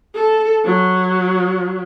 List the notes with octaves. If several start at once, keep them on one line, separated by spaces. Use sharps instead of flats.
A4
F#3